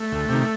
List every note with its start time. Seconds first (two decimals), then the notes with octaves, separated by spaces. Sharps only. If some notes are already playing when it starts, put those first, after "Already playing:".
Already playing: A3
0.12 D2
0.29 C3 D#3